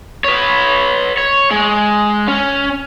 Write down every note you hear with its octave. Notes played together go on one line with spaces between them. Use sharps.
B4 C#5
C#5
G#3
C#4